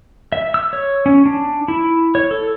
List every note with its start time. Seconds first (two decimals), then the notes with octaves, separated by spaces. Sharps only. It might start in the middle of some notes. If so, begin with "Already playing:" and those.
0.32 E5
0.54 E6
0.73 C#5
1.06 C#4
1.26 D4
1.68 E4
2.15 C#5
2.31 A4